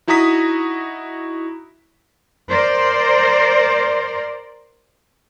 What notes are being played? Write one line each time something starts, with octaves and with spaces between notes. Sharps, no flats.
D#4 E4 F#4 A#5 D#6 B6
A#4 C5 D5